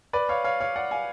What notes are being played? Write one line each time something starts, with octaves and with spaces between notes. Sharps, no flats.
B4 D5
C#5 F5
C#5 F5
C#5 F5
D5 F#5
F5 G#5